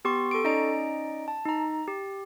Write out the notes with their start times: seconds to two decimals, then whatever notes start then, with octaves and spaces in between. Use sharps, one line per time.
0.05 B3 G4 C6 C#6
0.31 A4 C#6 D7
0.44 C#4 D#4 D5 D#5 A#5 D7
1.28 A5
1.45 D#4 A#5
1.88 G4